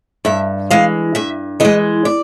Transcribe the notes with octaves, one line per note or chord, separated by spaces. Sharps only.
G2 E5
E3 G#3 F5
G2 E5
E3 G#3 D#5
D5